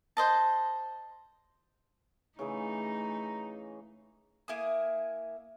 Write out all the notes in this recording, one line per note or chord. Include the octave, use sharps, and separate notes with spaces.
C5 D#5 A5
C#3 E3 A3 D#4 G#4 A#5
A#3 E4 G#5 D#6